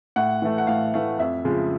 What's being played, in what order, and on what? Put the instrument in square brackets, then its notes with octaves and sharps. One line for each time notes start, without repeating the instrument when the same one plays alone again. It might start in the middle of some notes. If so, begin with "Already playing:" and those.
[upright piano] A2 F#5
E3 A3
F#5
A2 F5
E3 A3 F5
F2 E5
C#3 F3 G#3